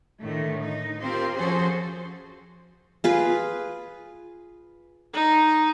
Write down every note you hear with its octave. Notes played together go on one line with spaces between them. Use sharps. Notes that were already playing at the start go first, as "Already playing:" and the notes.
A2 D3 D#3 A3
D#4
C4 F4 G4 A#4 C5
F3 C#4 F#4 G#4 A4 C5
F4 G#4 B4
D#4